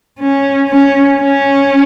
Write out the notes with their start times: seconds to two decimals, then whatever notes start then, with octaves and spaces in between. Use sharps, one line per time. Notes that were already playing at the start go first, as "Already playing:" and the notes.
0.20 C#4
0.69 C#4
1.20 C#4